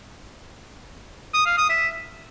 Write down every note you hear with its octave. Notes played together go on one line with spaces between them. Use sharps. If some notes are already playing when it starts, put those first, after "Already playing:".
D#6
F5
D#6
E5